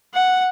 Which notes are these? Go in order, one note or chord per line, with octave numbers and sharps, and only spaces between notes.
F#5